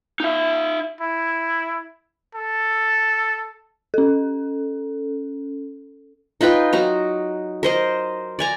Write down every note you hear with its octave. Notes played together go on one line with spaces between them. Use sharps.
D#4 E5
E4
A4
C#4 A4
D#4 F4 B4 G5
F#3 D#4 A#5
A#4 C5 D#5
D5 G#5 A#5